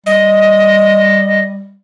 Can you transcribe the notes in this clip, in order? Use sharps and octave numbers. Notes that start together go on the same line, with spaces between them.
G3 D#5